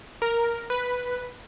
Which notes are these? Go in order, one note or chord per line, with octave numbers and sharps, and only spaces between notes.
A#4
B4